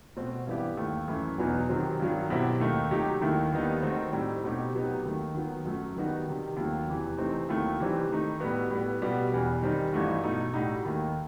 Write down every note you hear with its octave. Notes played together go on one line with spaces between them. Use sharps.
B2 A3 C4 F#4
G2 E3 B3 E4 G4
D#2 D#3 A3
F#2 E3 A3 E4
E2 B2 F#3 B3 D#4
C3 D#3 F#3 C4
G2 D#3 F#3
B2 F#3 C4 E4 G4
D#2 D#3 A3 D#4
C3 F#3 A3 D#4 G4
D#2 D#3 A3 E4
D#2 D#3 G3 B3 D#4
D#3 A3 C4 D#4 F#4
A2 G3 C4 D#4
B2 A3 C4 D#4 G4
C3 F#3 B3 D#4 G4
D#2 D#3 A3
D#3 F#3 B3
F#2 F#3 A3
D#3 G3 B3 D#4 F#4
C3 D#3 G3
D#2 D#3 F#3 A3
E2 C3 E3
C3 E3 A3 C4 D#4
D#2 D#3 F#3 A3 E4
C3 E3 G3 C4 D#4
D#3 A3 D#4
A2 G3 B3 F#4
A2 G3 B3
B2 G3 B3 F#4
E2 B2 G3
D#3 G3 C4 D#4
G2 E3 A3 D#4 F#4
B2 A3 D#4
A2 G3 D#4 F#4
D#2 D#3 A3